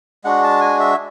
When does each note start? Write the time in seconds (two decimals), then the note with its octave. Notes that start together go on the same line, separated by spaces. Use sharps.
0.24 G#3 D4 F#4 F#5
0.44 A5
0.61 G#5
0.80 E5